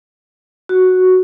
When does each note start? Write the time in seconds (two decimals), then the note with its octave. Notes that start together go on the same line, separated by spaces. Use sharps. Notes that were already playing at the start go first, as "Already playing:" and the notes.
0.69 F#4